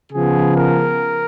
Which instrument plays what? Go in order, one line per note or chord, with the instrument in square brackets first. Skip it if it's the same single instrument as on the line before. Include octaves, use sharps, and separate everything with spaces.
[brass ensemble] C#3 F3 B3 G#4
A#4